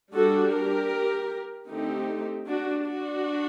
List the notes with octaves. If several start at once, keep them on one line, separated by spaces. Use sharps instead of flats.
G3 D4 F#4 A4
G4 A#4
D3 A3 C4 D#4 G4
D4 F#4
D4 F#4